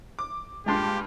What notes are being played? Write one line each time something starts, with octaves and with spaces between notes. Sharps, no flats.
D6
G2 A#2 G#3 G4 A5 C6